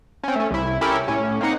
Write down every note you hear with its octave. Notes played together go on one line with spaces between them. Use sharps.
C4 C#4
A3 C#4
C2 E4
C#4 E4 G4 A4 A#4
A2 C#4
A#3 C4 D#4 F#5